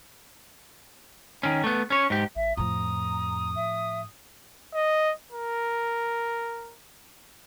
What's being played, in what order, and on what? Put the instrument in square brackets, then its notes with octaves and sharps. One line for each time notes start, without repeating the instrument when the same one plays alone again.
[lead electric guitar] D#3 C#4
A3 B3
C#4 C#5
G#2 G4
[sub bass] A1 [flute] E5
[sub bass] F2 [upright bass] A2 F3 [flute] A#5 [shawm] D#6
[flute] E5
[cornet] D#5
A#4